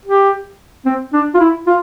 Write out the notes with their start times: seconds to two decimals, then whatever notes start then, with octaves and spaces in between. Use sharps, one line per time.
0.06 G4
0.86 C4
1.13 D4
1.34 F4
1.40 E4
1.67 F4